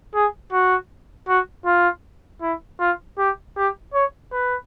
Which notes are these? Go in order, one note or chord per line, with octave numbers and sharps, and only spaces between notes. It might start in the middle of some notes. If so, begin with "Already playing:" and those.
G#4
F#4
F#4
F4
E4
F4
G4
G4
C#5
B4